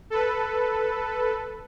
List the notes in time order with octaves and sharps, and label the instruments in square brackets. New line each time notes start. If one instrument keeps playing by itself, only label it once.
[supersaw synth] A4 B4